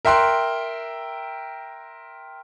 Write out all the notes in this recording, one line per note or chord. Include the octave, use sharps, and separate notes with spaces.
A#4 E5 G5 C6 F#6